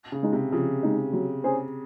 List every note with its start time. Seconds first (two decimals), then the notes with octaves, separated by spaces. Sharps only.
0.12 C#3
0.23 G#3 D#4
0.33 C3
0.52 C#3 F3
0.83 G#3 D#4
1.13 F#3
1.44 C#4 G#4 C5